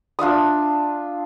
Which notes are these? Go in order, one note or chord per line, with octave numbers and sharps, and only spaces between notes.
D4 F4 E5 D#6